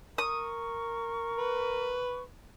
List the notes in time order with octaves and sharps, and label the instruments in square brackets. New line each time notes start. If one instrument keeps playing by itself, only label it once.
[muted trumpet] A#4 [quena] C#6 [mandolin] D#6
[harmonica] B4